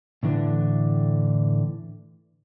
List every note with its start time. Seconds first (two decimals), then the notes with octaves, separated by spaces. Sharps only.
0.23 A2 D3 E3 D4